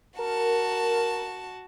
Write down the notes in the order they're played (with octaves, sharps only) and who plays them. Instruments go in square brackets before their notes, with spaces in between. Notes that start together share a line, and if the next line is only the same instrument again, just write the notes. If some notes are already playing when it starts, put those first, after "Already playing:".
[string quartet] F#4 A5 [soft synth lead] A#4